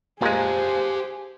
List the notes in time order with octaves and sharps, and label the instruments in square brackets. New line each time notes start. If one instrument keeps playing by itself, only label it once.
[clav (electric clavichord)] A#2 G#3 [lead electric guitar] G4 F5 [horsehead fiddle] G#4 C5